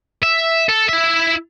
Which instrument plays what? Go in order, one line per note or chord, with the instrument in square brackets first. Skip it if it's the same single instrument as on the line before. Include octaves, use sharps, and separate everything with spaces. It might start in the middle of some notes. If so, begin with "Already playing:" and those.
[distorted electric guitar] E5
A4
E4 E5